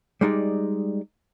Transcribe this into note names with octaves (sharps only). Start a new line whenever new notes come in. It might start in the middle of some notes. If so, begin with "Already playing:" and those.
G3 G#3 D#4 D5